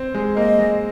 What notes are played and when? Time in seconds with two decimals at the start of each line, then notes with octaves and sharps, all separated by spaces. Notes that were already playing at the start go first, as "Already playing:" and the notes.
Already playing: C4
0.14 G#3
0.36 A#3 D#5
0.59 G#3